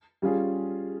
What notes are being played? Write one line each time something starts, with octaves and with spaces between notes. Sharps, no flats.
G3 C#4 F4 G#4